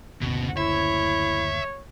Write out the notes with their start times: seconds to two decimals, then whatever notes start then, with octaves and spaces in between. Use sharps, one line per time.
0.21 F#1 D2 B2 C#4
0.57 E4 C#5 E5